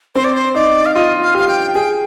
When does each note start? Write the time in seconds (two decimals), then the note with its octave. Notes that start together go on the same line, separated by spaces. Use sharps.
0.15 C4 C5
0.24 D5
0.35 C5
0.54 D#4 D5
0.86 F5
0.94 F4 D#5
1.22 F5
1.35 G4 F5
1.48 G5
1.75 G#4 G5